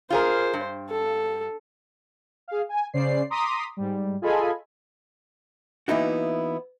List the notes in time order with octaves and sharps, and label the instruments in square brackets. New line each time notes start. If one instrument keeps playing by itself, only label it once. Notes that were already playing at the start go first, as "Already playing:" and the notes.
[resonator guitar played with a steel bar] F4 G#4 A#4 [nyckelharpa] C5
[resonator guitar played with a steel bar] G2
[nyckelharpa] A4
[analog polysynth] G#4 F5
G#5
C#3 C5 D5 C7
A#5 C6 D6 D#6 B6
G#2 G3
F4 G#4 A4 D#5 G#5 B5
[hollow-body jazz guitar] E3 A#3 B3 D#4 E4 F#4